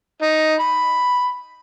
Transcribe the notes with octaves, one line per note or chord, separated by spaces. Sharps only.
D#4
B5